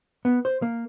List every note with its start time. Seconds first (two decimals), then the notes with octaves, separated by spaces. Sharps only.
0.25 B3
0.45 C5
0.62 A#3